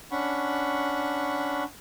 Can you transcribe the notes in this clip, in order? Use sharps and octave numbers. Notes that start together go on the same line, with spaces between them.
C#4 D4 F#5 B5 C#6